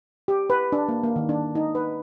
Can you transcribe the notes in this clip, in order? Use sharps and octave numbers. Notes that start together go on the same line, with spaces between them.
G4
B4
D4
A#3
A#3
D#3
D4
D#4
B4